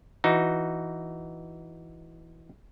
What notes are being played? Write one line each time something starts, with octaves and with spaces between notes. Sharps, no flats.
E3 D#4 F#4